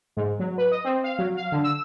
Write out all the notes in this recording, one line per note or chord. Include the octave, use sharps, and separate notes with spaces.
G#2
F#3
B4
D#5
C4
F5
F#3
F5
D3
E6